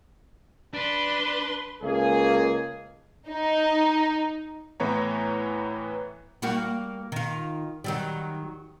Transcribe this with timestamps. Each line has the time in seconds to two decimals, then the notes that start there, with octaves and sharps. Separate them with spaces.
0.74 D4 B4 C6
1.83 C#2 A#3 G#4
3.28 D#4
4.80 A2 E3 B3 C#5 A#5
6.42 G3 A#3 F#4
7.12 D#3 F4
7.84 D#3 F#3 G3